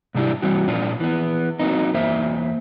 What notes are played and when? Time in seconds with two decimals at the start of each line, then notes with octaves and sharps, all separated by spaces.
0.15 G#2 C3 G3 D4 E4 G4
0.42 E3 G3 C4 F#4
0.68 A#2 F3 C#4 D4 F4
1.00 E3 B3
1.59 F#3 A#3 C4 D#4
1.94 E2 A#3 C5 E5